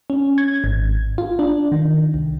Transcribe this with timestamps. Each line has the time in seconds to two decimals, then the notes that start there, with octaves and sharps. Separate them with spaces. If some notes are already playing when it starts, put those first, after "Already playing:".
0.10 C#4
0.38 G#6
0.64 G#1
1.18 F4
1.39 D4
1.72 D#3
2.14 C2